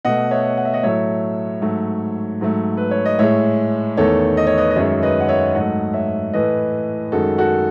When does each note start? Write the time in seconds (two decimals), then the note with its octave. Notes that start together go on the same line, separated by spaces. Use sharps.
0.05 B2 A3 D#5 F#5
0.31 C#5 E5
0.57 F#5
0.65 E5
0.74 D#5 F#5
0.83 A2 F#3 A3 C#5 E5
1.62 G#2 F#3 A3
2.41 G#2 F#3 A3
2.77 B4
2.91 C#5
3.05 D#5
3.19 A2 G#3 C#5 E5
3.97 E2 D#3 A3 A4 C#5
4.37 D#5
4.47 C#5
4.57 B4 D#5
4.71 D#5
4.76 F#2 D#3 G#3 C#5 E5
5.02 B4 D#5
5.20 F#5
5.28 C#5 E5
5.55 G#2 F#3 A3 D#5 F#5
5.94 C#5 E5
6.34 A2 E3 A3 B4 D#5
7.12 F#2 D#3 G#3 F#4 A4
7.38 F#4 A4